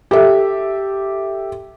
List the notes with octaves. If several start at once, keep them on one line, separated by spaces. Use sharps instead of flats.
G4 A4 E5